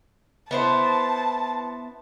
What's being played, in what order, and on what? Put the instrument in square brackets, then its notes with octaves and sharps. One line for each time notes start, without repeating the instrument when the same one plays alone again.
[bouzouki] B3 E4 C5 [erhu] A5